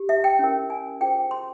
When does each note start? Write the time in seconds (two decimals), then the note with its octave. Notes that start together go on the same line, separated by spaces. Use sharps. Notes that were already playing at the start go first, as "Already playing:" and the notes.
Already playing: G4
0.09 E5
0.24 G5
0.39 C#4 E4 A#4
0.70 G#5
1.01 F4 G#4 C5 G5
1.31 C6